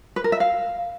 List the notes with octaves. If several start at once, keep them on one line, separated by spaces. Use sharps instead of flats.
B4
A#4
E5
F5